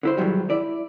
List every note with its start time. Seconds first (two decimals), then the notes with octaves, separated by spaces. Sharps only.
0.03 D3 E4 C5
0.17 G#2 D#3 E3 F#3 G3
0.50 E4 D5